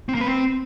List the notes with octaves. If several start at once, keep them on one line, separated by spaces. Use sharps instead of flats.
C4
A#3
B4
C4